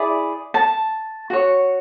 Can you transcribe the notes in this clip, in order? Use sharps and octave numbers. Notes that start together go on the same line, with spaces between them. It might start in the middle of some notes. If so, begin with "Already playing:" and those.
Already playing: E4 G#4 D5
A5
F#4 C#5